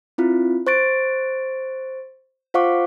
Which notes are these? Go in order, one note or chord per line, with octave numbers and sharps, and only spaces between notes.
C4 E4 F4
C5 C#6 A6 D7
F4 C5 F5 F#5 C#6 D6